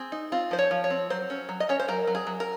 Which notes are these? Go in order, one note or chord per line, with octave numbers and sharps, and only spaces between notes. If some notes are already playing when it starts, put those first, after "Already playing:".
Already playing: C4 G#4
D#4
C4 F4
F3 C5
C#5
F3
C#5
C4
F#3 C5
C#4
F#3
D#5
C#4 C#5
C5
F#3 A#4
F#3
G#4
F#3
A#4